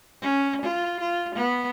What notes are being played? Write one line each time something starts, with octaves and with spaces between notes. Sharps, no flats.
C#4
F4
F4
B3